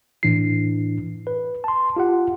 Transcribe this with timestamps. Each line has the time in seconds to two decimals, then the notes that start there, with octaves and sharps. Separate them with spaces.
0.23 A2 E3 D4 E4 C7
1.27 B4
1.64 A5 C6
1.96 F4 G4 F#5